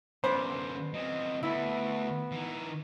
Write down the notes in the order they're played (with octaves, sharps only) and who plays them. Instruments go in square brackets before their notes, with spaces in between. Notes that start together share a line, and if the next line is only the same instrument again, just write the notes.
[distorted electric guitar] F#2 D3 [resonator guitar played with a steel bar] B3 D5 [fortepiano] C5
[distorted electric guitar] F#3 C4 [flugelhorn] D#5
[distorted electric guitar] D2 A3 [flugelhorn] B3 [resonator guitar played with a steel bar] E4
[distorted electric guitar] E3 D#4